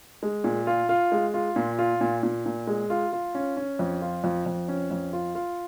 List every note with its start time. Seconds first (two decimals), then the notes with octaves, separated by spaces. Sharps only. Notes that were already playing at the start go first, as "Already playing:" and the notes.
0.23 G#3
0.44 A#2
0.67 F4
0.89 F4
1.12 G#3
1.34 F4
1.56 A#2
1.79 F4
2.01 A#2
2.23 A#2
2.46 A#2
2.67 G#3
2.90 F4
3.12 F4
3.35 C#4
3.57 C#4
3.79 F2
4.02 F4
4.24 F2
4.46 F2
4.68 C#4
4.91 F2
5.13 F4
5.35 F4